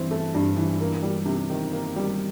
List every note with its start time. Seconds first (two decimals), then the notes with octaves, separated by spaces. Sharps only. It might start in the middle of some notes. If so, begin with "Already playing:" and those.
Already playing: G2 E3 C4
0.11 A3
0.34 G2
0.57 E3
0.81 A#3
1.03 G3
1.26 C3
1.50 D#3
1.72 A#3
1.96 G3